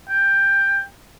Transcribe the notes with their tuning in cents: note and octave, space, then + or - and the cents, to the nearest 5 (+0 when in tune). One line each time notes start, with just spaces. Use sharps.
G5 +15